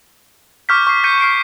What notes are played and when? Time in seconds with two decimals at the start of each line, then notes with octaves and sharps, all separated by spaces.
0.69 C#6 D6 F6 G6 B6
0.87 C#6 C7
1.04 G6 B6 C#7 D#7
1.20 F6 C7 D7